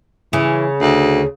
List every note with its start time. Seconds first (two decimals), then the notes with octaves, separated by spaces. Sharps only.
0.33 C#3 E3
0.81 D2